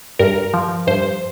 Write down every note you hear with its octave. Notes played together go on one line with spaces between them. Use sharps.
G2 A#4
F3
G2 C5